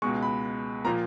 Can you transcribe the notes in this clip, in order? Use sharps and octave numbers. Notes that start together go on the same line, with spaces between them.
C#2 B2 G#3 C#6
B5
A#2 F3 A#3 A#5